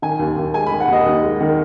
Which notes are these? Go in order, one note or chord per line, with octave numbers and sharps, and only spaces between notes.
D#3 G#5
D#2
D#2
G#3 G#5
B5
D#3
F#5
D#2 D#5
D#2
G#3
D#3